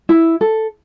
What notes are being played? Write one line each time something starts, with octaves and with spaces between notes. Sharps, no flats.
E4
A4